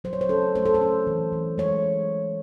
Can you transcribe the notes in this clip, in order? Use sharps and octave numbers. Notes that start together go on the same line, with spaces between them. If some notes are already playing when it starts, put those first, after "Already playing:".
F#3 C5
C#5
C5
C#4 A4
A3 C5
A4
C5
C#4
E3
E3
G#3 C#5